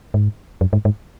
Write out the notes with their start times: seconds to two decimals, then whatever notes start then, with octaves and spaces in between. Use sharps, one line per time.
0.14 G#2
0.61 F#2
0.73 G#2
0.85 G#2